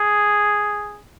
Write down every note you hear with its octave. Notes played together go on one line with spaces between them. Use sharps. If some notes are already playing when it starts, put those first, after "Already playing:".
Already playing: G#4